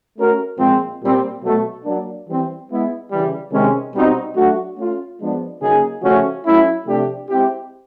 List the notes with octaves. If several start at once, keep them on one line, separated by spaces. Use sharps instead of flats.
A3 C#4 F#4 A#4
A#2 F3 G#3 C4
A#2 G3 C4
B2 F#3 A3
F#3 A#3 D4
E3 G3 C4
G#3 B3 E4
C#3 E3 G3
C3 D#3 G#3 C#4
B2 G3 C4 D#4 F#4
F#3 A3 D4 F#4
A3 C#4 F4
F3 G#3 B3 D4
C#3 F#3 A#3 D#4 G#4
C#3 F3 A3 C#4 F#4
F#3 A3 C#4 E4
C3 F3 A3 D4 G4
G#3 C4 E4 G4